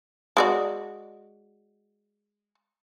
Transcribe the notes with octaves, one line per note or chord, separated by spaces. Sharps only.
G#3 F#4 D5